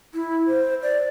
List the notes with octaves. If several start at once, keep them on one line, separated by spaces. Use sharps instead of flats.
E4
C5
D5